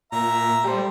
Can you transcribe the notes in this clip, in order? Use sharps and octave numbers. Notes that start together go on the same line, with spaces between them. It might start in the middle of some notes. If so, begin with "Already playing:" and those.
A#2 E5 A#5
G3 G4 A4 C5